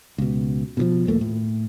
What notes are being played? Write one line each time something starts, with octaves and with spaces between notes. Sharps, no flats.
C#2 B2
B2 D#3 F3
A#1 D#2 A3 A#3
A2